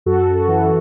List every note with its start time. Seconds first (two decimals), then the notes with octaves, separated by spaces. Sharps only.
0.06 F#2 F#4 A4
0.48 E3